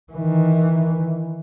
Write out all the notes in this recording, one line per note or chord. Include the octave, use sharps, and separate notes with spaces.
D#3 E3